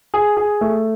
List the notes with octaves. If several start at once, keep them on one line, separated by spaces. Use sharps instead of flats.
G#4
G#4
A3